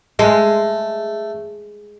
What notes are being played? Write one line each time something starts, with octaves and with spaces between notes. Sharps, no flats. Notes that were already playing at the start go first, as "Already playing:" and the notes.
G#3 A3